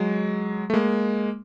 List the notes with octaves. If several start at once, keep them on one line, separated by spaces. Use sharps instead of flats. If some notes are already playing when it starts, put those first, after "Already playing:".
Already playing: F#3 G#3
A3
G#3 A#3